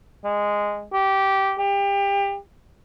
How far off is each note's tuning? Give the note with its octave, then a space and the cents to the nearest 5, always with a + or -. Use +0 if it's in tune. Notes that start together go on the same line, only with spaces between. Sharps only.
G#3 -10
G4 -15
G4 +30